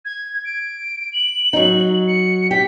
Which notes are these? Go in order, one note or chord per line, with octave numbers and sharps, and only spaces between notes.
G#6
D7
F#7
F#3 D#4
C#7
G4 B6